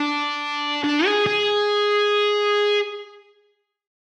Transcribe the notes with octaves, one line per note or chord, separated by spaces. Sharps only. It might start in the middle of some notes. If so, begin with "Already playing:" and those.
Already playing: D4
D4
G#4
G#4